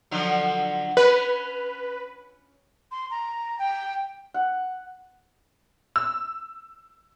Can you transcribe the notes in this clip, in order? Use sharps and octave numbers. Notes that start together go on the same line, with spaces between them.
D3 F3 F#3
C#4 B4
C6
A#5
G5
F#5
E6